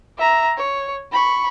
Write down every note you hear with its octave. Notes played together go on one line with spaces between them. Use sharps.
E5 A#5
C#5
B5 C#6